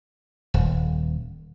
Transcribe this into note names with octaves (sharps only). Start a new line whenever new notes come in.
D#1